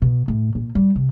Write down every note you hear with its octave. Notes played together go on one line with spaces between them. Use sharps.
B2
A2
A#2
G3
C3